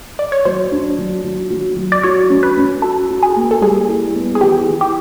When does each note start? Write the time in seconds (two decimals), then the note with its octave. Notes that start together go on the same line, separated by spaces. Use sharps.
0.19 D5
0.32 C#5
0.45 F#3 C5
0.72 D4
0.98 F#3
1.24 F#3
1.50 F#3
1.77 F#3
1.92 D5
2.03 F#4 C#5
2.30 C#4
2.43 B4
2.57 C#4
2.82 F#4 A4
3.10 F#4
3.23 G#4
3.36 A#3
3.51 A4
3.61 G3 G#4
3.88 E4
4.15 B3
4.35 G#4
4.41 E3 G4
4.67 E3
4.81 G4